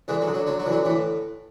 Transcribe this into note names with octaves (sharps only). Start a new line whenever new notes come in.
D3 E3 G#3
F#3
D3
F#3
D3 F#3
F#3
D3 E3
F#3
A2 E3